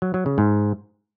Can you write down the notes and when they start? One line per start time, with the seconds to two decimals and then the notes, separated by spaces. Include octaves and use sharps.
0.02 F#3
0.14 F#3
0.26 C#3
0.38 G#2